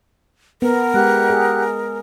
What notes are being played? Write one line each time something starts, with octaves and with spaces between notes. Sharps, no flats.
B3 A#4
G#3 G4 F#5 F#6
G#4